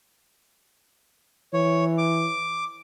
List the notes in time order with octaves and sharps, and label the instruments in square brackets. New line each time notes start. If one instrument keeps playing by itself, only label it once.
[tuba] E3 [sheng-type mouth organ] C#5
[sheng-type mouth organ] D6